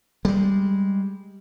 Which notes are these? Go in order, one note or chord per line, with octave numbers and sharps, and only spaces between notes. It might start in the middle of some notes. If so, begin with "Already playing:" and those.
G3 G#3